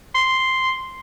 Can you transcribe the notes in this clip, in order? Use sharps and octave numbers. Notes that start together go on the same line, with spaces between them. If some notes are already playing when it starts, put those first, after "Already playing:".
C6